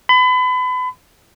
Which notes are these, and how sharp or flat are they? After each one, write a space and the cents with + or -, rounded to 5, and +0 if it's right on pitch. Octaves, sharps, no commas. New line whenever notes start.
B5 +35